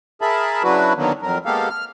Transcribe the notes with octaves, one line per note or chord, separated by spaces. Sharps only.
G#4 A#4 E5 A5 B5
C#3 F#3 D4 E4 F#4 B4
D3 D#3 F#3 A#3 B3
F2 F#3 A#4
G#3 A#3 B3 G4 A4 F5
F6